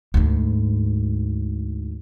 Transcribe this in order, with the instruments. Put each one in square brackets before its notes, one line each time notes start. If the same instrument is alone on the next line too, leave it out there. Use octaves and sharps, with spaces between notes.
[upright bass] D2 G#2